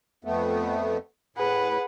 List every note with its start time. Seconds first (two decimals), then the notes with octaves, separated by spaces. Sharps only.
0.25 F2 A3 B3
1.36 A2 G#4 B4 F#5